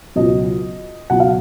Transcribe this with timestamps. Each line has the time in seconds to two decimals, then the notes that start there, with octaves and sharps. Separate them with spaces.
0.16 C#2 B2 F#3 D#5
1.10 C#2 B2 F#3 F#5
1.20 F5